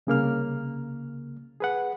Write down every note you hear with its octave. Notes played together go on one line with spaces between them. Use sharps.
C2 C#3 A#3 F6
G#4 B4 F#5